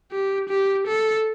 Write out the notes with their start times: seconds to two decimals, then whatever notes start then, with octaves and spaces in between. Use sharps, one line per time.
0.12 G4
0.50 G4
0.88 A4